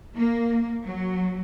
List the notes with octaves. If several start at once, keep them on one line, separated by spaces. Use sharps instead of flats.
A#3
F#3